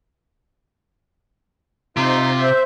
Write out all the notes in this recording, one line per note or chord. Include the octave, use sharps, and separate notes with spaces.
C3 D#4 F4 C5
C5 E5 G6